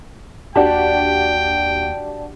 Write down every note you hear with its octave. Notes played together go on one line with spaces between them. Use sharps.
D#2 D4 F#4 G4 D5 G5 A5